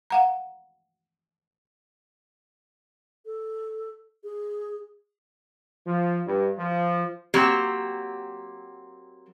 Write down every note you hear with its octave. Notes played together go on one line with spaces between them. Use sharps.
F5 F#5 A#5
A4
G#4
F3
G2
F3
F#3 A#3 C4 G4